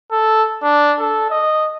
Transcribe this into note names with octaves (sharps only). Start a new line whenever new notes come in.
A4
D4
A4
D#5